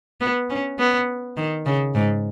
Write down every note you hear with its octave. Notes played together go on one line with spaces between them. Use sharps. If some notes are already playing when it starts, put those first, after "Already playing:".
B3
C#4
B3
D#3
C#3
G#2